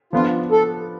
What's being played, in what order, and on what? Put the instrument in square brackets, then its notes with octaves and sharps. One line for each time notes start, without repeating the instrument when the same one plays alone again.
[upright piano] F3 B3 D4 [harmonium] F4
[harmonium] A4